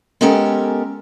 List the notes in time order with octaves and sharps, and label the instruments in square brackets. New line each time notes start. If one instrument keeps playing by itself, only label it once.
[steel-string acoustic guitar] G#3 B3 C#4 G4 A4 A#4